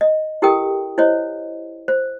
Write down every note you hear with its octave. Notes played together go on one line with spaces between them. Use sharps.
D#5
E4 G4 A4 A#4 G5 D#6
E4 C5 C#5 D#5
C5